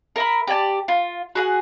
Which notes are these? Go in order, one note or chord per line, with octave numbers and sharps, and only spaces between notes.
A#4 E5 B5
G4 D5 G#5 A5
F4
F#4 G#4 F#5